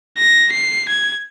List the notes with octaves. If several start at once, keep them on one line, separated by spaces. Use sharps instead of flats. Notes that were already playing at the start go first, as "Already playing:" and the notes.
A#6
C7
G#6